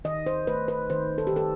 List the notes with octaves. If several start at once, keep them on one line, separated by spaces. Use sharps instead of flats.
D#3 D#5
C5
A3 B4
B4
D#3 C5
A4
G4
D#3 A4